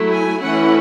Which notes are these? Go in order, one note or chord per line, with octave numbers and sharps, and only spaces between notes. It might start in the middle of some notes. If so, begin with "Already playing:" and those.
Already playing: F#3 A3 E4
G#5
E3 A3 C#4 E4 F#5